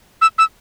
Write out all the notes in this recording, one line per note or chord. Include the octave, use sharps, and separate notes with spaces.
E6
E6